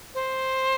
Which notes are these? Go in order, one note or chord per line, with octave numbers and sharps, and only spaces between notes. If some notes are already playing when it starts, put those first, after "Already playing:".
C5